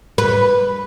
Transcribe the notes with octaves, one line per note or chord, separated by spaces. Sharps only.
B4